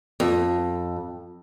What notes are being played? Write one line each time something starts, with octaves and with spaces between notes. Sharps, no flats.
F2